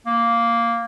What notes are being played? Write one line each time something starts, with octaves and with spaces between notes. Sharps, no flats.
A#3